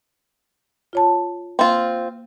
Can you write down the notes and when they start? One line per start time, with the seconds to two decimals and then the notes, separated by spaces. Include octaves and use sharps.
0.93 F4 C#5 A5
1.59 A#3 C4 F4